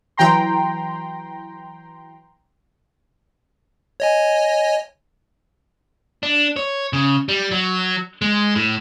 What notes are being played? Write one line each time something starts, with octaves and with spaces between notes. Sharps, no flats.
E3 F#3 G5 A#5 C6
C#5 D#5 G#5
D4
C#5
C#3
G3
F#3
G#3
A2